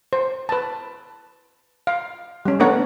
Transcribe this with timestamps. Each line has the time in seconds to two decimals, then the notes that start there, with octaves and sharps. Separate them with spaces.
0.13 C5
0.49 B4 A5
1.87 F5
2.45 G3 C#4
2.60 A3 B3 D4 A#4 C#5 F#5